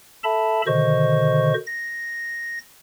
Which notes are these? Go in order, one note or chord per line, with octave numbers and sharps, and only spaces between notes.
A4 E5 A5 B5
B2 D3 D#3 C5 D#5 C#6
A#6